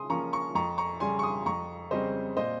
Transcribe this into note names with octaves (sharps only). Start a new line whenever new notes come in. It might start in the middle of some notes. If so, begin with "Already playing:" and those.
Already playing: C#3 C6 D#6
F3 A#3 C#4 A#5 C#6
A#5 C#6
F2 A#5 C#6
A#5 C#6
C#3 G3 G#5 C6
C#6
C6 D#6
F2 A#5 C#6
C#3 G3 C4 C5 D#5
A#2 C5 D#5